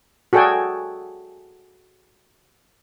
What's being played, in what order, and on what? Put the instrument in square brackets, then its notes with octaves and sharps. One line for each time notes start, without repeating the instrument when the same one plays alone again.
[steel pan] F#4 G#4 A4 D5 G5 G#5